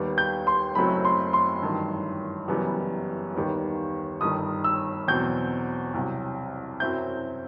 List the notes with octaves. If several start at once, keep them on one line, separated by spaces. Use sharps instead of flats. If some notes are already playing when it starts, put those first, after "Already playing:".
Already playing: D#2 D#3 G3 B3
G6
C6
F#1 F#2 F#3 A3 C4 B5
C6
C6
A1 G2 D#3 F#3
F#1 F#2 E3 G3 B3
D#2 D#3 G3 B3
G1 G2 D#3 D#6
E6
E2 B2 F#3 C4 G6
C2 C3 F#3
F#2 F#3 C4 E4 G6